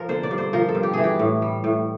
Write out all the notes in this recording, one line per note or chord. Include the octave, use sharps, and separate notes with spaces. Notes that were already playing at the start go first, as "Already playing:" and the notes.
Already playing: F3 A#4
D3 C5
D5
G2
C5
F3 A#4
A4
G2
G4
E3 G#4
G4
A2
G3
A2